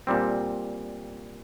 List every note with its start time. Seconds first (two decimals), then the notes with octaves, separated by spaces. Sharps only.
0.07 A#2 G3 C4